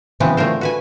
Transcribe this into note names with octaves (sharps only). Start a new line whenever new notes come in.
C#3 E3 F#3 G#3 B3 C4
D3 A3 F4 A#4 C5
F#4 B4 G#5